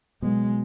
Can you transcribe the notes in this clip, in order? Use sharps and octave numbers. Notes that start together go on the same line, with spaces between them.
B2 F#3 G#3 B3